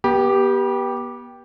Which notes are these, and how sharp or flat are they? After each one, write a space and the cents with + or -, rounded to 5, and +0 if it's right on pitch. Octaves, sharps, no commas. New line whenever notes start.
B3 -35 G4 +0 B5 -35